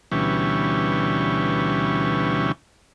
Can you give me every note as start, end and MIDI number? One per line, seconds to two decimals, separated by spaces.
0.12 2.52 38
0.12 2.52 47
0.12 2.52 52
0.12 2.52 55
0.12 2.52 61